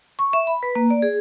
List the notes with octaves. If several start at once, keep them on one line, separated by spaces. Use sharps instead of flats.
C#6
E5
B5
B4
A#3
D5
G#4